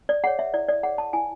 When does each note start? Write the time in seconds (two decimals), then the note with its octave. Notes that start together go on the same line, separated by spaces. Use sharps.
0.09 D5
0.24 G#4 C#5 F#5
0.39 E5
0.54 E4 D5
0.69 D5
0.83 G#4 C#5 F#5
0.98 A5
1.13 E4 G#5